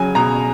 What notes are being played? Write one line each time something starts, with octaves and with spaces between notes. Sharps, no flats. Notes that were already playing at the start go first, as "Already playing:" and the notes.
Already playing: C#3 F#3 G#5
B2 A#5